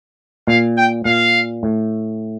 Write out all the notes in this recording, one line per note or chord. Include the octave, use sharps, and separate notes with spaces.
A#2 F5
G5
A#2 F5
A2